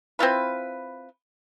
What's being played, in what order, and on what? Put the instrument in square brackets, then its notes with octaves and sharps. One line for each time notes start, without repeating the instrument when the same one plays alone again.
[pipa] C4 E4 F4 B4